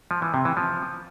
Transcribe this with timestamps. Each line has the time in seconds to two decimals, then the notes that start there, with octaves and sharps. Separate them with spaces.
0.11 F3
0.22 E3
0.34 C3
0.45 E3
0.57 F3